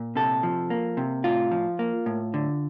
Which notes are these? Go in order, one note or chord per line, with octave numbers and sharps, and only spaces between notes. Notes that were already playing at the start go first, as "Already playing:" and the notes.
Already playing: A#2
C3 A4
F3
A#3
C3
A2 F4
F3
A#3
A2
D3